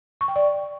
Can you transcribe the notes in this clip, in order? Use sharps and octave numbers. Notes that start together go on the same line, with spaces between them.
C#6
G5
D5